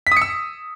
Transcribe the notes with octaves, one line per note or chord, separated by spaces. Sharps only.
B6
D#6
C#7
E6